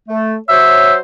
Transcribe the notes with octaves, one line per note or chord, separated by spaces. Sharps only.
A3
F#3 C5 C#5 E5